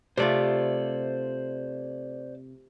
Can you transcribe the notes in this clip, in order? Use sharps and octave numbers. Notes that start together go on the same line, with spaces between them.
C3 A3 F4 C5 D5